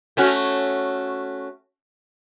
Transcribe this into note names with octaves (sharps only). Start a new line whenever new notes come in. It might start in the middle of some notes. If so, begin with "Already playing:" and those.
A3 C#4 F#4